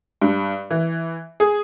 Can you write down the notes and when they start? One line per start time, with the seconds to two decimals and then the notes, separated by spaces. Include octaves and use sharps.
0.22 G2
0.70 E3
1.40 G#4